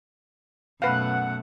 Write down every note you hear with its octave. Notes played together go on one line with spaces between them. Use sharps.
F#2 B2 A3 B4 F5 F#5